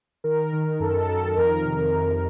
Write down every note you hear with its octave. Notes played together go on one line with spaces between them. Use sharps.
D#3 A#4
D#3
F#2 A4
D#3 A4
F2 A#4
C3
D#3